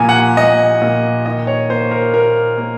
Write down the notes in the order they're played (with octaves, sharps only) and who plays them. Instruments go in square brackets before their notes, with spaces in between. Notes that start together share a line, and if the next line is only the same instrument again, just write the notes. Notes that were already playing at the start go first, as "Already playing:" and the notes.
Already playing: [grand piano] A#2 F3 G#5 A#5
F#5
A#2 D#5
A#2
D#3 D#5
C#5
A#3 C5
A#4
A#3 A#4
A#3